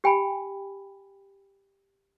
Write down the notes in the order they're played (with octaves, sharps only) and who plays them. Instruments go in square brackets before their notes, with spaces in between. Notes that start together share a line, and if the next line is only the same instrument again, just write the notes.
[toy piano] G4 G5 G#5 B5